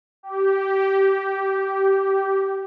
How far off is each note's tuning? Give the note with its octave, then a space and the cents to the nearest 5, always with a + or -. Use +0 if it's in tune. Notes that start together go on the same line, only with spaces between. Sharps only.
G4 -15